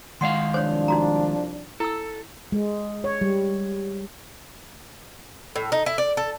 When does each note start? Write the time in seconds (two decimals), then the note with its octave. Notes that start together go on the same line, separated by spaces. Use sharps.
0.21 D#3 G#3 D#5 F5 F#5 C6
0.54 C2 F3 D4 C5 C#5
0.88 D#4 F#4 A#5
1.80 E4 A4 E6
2.52 G#3
3.04 C#5
3.21 G3
5.56 A2
5.72 D#4
5.86 E4
5.98 D5
6.17 A4